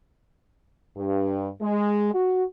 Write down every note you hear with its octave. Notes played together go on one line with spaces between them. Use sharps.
G2
G#3
F#4